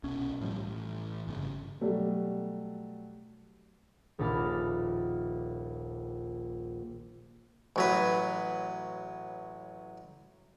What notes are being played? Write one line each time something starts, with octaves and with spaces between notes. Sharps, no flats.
C2 B2 C#4
A2 F3 G3
A1
G1 A#2 C#3
B2 F#3 G3 A3
D#1 A#1 D#4 A5 B5 F6
A1 F#3 B4